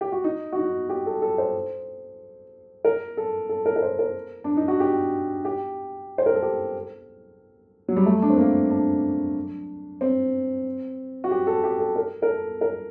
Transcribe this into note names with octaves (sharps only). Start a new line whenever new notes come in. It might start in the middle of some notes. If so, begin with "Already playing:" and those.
G4
F#4
D#4
F#4
D#4
G4
A4
A4
C5
A#4
A4
A4
A#4
A#4
C5
A#4
D4
D#4
F#4
G4
G4
C5
A#4
A4
G4
F#3
G3
A3
D4
C4
A#3
D4
C4
F#4
G4
A4
G4
A4
A#4
A#4
A4
A#4